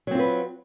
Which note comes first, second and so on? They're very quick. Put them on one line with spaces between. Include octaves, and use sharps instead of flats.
F#3 C4 F4 B4